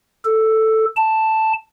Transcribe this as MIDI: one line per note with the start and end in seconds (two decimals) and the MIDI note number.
0.25 0.85 69
0.96 1.52 81